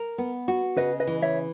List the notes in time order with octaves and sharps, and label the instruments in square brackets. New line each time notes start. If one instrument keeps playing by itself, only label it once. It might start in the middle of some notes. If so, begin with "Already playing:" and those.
Already playing: [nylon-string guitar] A#4
B3
F#4
[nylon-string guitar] C#3 [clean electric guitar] B4 D#5
[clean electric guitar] B4 D#5
[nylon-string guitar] E3
[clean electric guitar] C#5 E5